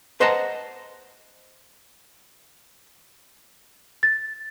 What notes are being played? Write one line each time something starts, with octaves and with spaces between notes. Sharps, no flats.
B4 C5 D#5 F#5 A5 A#5
A6